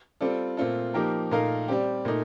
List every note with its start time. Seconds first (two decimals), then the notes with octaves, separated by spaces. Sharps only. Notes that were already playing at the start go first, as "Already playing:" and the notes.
0.21 G3 C4 F4 A4 D5
0.57 A#2 A3 C4 F4 A4
0.94 F3 A#3 D#4 G4 A#4
1.31 A#2 A3 D#4 A#4 F5
1.68 G3 C4 G4
2.05 A#2 A3 D#4